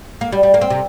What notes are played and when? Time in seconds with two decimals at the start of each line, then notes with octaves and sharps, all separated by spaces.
0.21 A#3
0.32 G3
0.43 G3
0.54 A#3
0.61 C4
0.70 C3